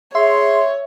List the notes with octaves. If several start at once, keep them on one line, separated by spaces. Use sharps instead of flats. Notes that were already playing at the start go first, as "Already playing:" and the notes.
G#4 C#5 E5 C6